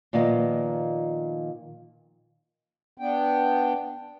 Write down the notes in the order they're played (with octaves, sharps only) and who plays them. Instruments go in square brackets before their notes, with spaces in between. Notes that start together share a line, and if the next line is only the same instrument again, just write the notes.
[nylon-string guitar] A#2 D#3 F3 B3 D#5
[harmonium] B3 D4 G5